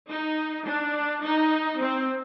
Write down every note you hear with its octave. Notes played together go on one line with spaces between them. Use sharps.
D#4
D4
D#4
C4